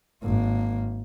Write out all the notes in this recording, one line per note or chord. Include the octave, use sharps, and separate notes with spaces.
G#1 A#3